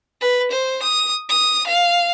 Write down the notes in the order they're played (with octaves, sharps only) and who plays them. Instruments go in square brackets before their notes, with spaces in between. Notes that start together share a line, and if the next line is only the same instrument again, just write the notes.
[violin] B4
C5
D#6
D#6
F5